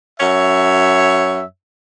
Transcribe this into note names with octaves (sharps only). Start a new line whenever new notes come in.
F#2 C#5 E5